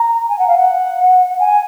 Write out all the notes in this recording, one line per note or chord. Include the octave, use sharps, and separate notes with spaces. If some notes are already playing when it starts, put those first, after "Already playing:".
Already playing: A#5
G#5
F#5
F5
F#5
G#5